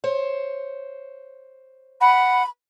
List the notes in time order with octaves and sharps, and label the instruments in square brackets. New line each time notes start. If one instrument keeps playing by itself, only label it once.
[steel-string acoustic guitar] C5 C#5
[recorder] F#5 [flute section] B5